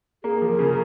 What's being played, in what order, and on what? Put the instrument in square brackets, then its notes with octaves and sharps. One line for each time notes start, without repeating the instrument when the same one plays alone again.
[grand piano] A#3 [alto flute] G#4
[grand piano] F3
[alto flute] A#4
[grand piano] C#3